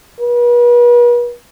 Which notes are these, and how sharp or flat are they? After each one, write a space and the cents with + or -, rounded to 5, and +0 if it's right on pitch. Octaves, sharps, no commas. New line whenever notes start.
B4 -40